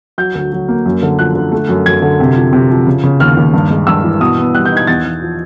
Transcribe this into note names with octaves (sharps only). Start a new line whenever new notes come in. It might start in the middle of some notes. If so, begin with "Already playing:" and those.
F#3 G6
D2
F#3
A#3
F#2
D3
F3 F#6
D3
A3
F#2
F#2 G#6
D3
C3
F3
C3
F3
C#3
C#3
D#2 F6
D#2
G2
G#3
G2 E6
E3
B2 D#6
B3
G3 F#6
G6
D#4
G#6
E2 A6
E2
F3